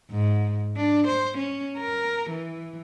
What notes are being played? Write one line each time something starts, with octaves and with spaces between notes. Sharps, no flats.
G#2
D4
C5
C#4
A#4
E3